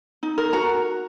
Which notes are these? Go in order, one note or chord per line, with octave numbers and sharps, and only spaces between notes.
D#4
A#4
F#4 A#5